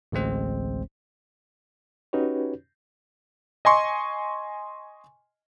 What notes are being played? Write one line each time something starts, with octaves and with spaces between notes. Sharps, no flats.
A1 D2 G#3 C4 C5
C#4 D#4 F#4 G4 B4 C#5
D#5 G#5 C6 C#6